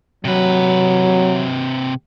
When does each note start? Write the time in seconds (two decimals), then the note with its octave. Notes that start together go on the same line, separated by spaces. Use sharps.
0.25 C3 F#3 B4